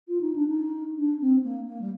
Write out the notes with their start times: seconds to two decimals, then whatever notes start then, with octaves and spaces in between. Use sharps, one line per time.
0.08 F4
0.20 D#4
0.35 D4
0.48 D#4
0.97 D4
1.20 C4
1.44 A#3
1.66 A#3
1.81 G3